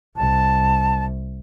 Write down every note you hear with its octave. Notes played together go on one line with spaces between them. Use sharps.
C2 A5